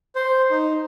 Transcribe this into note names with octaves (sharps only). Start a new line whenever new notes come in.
C5
D#4